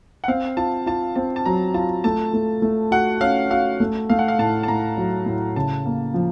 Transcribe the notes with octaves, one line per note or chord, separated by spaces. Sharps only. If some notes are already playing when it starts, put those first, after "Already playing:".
F#5
C4 F5
F4 A5
F4 A5
C4 A5
A5
F#3 A#5
F4 A5
A3 A5
A3
A3
F#4 F#5
C#4 F5
F#4 F5
A3
A3 F5
F#5
F5
A2 A5
A5
A2 A#5
F#3
A2
C#3 A5
A#3
F3